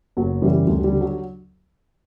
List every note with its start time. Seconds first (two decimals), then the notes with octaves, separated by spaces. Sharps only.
0.17 F#1 F#3
0.42 F#2 C#3 E3 G3
0.67 D2 G3
0.84 G3
0.92 D3
1.01 F#3